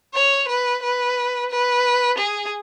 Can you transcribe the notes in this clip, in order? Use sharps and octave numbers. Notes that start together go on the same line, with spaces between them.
C#5
B4
B4
B4
G#4